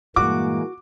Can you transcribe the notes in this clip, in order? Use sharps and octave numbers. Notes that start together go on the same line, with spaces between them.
G2 A#2 E3 G#3 A#3 F#4 D6